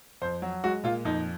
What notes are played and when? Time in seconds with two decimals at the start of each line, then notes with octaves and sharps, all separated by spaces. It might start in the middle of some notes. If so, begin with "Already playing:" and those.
0.22 F2 C5
0.42 F#3
0.64 G#3 F#4
0.84 A#2 F4
1.05 F2 D#4